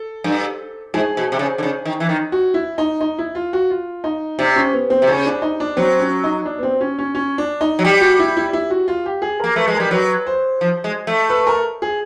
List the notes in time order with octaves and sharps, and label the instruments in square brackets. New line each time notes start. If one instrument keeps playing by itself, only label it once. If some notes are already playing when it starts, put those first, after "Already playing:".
Already playing: [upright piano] A4
[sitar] G2
[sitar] G#2 [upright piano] G#4
[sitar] B2
C3
C#3
D3
C#3
D#3
E3
D#3
[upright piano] F#4
E4
D#4
D#4
E4
F4
F#4
F4
D#4
[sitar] C3 [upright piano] D4
[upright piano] C#4
B3
C4
[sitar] C3
[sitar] C#3 [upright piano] C#4
[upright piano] D4
D#4
D4
[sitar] F#3 [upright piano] C4
[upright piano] C#4
D#4
D4
B3
C4
C#4
C#4
C#4
D4
D#4
[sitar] F#3
[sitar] G3 [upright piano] G4
[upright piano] F#4
E4
E4
E4
F#4
F4
G4
G#4
[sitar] A#3 [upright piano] A#4
[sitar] A3 [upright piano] B4
[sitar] G#3
[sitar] G3 [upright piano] A#4
[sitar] F#3 [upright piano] B4
[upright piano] C5
[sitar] F3
G#3
A3
[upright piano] B4
A#4
G#4